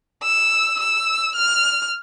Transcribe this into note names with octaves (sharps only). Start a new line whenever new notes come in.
E6
E6
F6